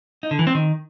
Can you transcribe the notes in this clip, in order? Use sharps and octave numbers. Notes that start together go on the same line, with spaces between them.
D#4
D3
E3
C4
D#3